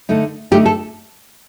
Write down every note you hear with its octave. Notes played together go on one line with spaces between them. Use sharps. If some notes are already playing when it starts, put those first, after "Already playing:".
D3 A3 D#4
D3 A3 D#4 G4
A4